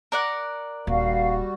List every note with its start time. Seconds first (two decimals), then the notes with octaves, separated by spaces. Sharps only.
0.12 A#4 D5 F#5
0.87 D#1 G3 F#4 F5